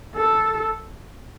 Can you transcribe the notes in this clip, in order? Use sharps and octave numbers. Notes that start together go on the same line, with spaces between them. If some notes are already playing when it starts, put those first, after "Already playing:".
A4